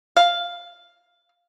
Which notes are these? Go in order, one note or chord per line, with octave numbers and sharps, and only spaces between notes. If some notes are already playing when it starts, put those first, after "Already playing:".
F5